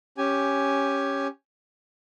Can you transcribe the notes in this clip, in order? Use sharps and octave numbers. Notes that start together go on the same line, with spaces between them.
C#4 G4 G#5